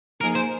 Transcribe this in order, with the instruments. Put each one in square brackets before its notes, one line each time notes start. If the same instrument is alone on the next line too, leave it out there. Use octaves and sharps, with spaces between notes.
[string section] F3 A#3 D#4 G#4 [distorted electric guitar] A#4
[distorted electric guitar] C5